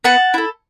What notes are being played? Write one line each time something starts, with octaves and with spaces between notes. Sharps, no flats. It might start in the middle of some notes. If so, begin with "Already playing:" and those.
B3 F#5 A5
E4 A4